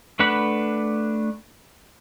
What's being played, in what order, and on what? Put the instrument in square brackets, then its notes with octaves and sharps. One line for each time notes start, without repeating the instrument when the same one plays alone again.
[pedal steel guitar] A3 D4 B4 F#5 B5